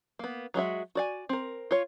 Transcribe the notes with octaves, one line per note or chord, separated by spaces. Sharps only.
A#3 B3
F#3 G#3 F#4 E5
F#4 D5 G#5
C4 A#4
F4 C#5